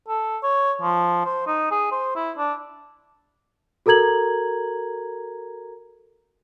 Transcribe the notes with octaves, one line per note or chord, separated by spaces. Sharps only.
A4
C#5
F3
C5
D#4
G#4
C5
E4
D4
F#4 A4 A#4 A#5 G#6 F#7